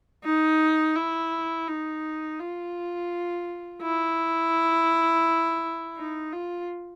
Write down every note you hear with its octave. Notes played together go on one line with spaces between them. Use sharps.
D#4
E4
D#4
F4
E4
D#4
F4